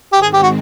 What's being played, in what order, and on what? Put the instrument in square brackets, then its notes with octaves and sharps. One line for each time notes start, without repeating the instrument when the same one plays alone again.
[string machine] G#2 D#3 G#3 C4 [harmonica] G4
[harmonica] G#4
G4
F#4